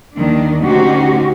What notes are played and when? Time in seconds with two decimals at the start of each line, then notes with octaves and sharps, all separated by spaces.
0.16 D#2 D#3 D4
0.63 D2 C#4 D#4 F#4 G4 C5